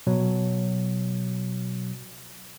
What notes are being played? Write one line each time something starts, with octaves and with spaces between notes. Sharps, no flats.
B2 F#3